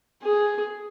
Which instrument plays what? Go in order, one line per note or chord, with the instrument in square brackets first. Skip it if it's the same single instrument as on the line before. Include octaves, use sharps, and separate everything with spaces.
[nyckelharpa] G#4